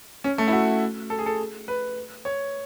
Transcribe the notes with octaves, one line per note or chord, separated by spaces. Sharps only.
C#4
A3
E4
F#4
A4
G#4
A4
B4
C#5